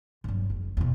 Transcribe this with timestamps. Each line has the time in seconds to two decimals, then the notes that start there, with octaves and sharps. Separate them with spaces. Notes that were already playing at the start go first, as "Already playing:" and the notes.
0.24 G2 F#3
0.50 F#1
0.77 E2 B2